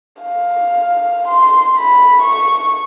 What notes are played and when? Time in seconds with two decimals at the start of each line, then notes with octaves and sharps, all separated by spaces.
0.22 F5
1.28 C6
1.77 B5
2.22 C#6